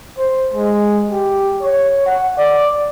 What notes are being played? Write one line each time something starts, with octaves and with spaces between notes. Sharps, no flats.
C5
G#3
G4
C#5
F#5
D5